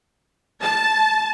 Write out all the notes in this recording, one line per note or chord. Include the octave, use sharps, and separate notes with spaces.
A5